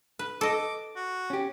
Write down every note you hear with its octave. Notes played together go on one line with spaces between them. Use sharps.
B4
A4 D#5 D6
F#4
C#4 G4